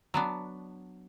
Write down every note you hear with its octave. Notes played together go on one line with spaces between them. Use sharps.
F#3 B3 D4